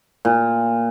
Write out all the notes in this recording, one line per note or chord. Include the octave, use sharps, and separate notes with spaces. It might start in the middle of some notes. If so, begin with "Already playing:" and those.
A#2